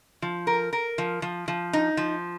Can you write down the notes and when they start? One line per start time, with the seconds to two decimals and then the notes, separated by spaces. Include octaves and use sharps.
0.22 F3
0.47 A#4
0.73 A#4
0.98 F3
1.22 F3
1.48 F3
1.73 D#4
1.97 F3